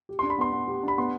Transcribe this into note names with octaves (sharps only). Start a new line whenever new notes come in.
G4
D4 C6
B5
B3 C6
B3
G4
D4 B5
B3 C6